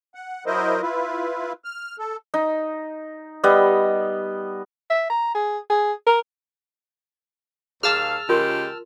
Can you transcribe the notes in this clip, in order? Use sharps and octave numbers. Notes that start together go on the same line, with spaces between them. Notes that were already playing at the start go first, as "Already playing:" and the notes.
F#5
F#3 E4 A#4 C5 D#5
E4 F4 B4
F6
A4
D#4
G3 B3 D#5
E5
A#5
G#4
G#4
A#4
D#2 G#4 F5 A5 D6 E6 F6
C#3 G#3 F4 G4 A#4 C6